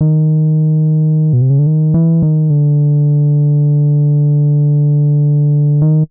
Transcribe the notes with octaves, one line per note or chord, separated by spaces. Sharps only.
D#3
B2
C3
C#3
D3
D#3
E3
D#3
D3
D#3